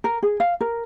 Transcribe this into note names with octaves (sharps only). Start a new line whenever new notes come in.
A#4
G#4
F5
A#4